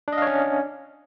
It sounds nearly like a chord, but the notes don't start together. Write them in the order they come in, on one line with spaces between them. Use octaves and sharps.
D4 D#5 F5 C#5 C#4